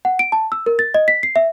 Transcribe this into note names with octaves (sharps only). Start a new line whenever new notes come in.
F#5
D7
A5
E6
A#4
A6
D#5
B6
C7
E5